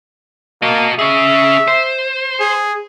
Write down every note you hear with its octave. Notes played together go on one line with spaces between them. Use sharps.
A#3 F#4 D#5
C#4 G#4 E5
C5
G#4